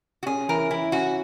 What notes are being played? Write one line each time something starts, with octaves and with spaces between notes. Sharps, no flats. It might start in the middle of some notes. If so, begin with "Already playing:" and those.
F#4
C#4 G#4
E3 A#4
E3 E4
C#4 F#4